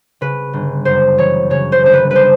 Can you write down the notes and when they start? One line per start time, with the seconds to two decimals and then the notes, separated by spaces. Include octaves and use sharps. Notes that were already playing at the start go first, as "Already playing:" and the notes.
0.21 C#3 B4
0.53 G1
0.85 F#2 C5
1.17 E3 C#5
1.50 C#3 C#5
1.72 C5
1.83 G1 C5
1.93 B4
2.11 B4 C5